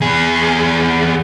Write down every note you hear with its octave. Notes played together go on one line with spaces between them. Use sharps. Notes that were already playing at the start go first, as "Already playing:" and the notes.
E2 G#4